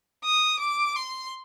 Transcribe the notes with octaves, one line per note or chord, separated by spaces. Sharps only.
D#6
D6
C6